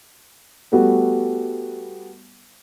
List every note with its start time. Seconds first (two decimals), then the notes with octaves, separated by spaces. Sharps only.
0.72 G3 A3 B3 F#4